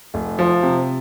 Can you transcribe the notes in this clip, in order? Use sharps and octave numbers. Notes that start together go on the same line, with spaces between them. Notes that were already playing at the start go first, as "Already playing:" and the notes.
F1
F3
C3